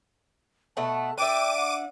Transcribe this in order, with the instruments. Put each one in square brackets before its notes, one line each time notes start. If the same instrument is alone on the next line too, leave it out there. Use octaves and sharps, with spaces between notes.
[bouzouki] B2 A3 F#5 [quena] A5
[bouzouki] D4 E5 [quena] G5 [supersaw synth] D6 D#7
[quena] F#5